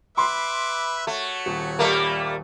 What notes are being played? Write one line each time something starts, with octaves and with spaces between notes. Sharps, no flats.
B4 E5 B5 C6 D6
A3 F#4 C#5
D#1
G3 A3 A#3